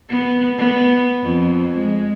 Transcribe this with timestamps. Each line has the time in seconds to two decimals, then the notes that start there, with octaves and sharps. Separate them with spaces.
0.10 B3
0.58 B3
1.23 F2
1.78 G#3